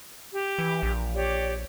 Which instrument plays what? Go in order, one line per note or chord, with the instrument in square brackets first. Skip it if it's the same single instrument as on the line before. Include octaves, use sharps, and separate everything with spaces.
[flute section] G4
[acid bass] E3
A#1
[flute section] G4 C#5 D5